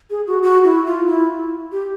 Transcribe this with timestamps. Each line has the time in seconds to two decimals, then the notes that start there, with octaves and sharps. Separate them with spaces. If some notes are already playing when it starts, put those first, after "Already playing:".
0.10 G#4
0.27 F#4
0.43 F#4
0.64 E4
0.86 F4
1.07 E4
1.72 G4